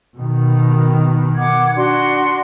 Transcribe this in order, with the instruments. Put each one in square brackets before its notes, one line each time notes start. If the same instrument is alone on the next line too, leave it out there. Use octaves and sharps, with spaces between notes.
[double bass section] B2 D#3
[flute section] F#5 D6 G#6
D4 F#4 C6